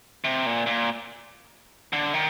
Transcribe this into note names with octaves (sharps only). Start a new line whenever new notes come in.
C3
A#2
A#2
D3
D#3